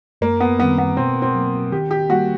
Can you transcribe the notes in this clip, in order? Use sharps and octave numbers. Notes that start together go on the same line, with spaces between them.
F#2 A#3
B3
D#3 G3 B3 C4
B3
B2 C4
C4
F#3 A#3
D#3 G4
G4
G3 A#3 F#4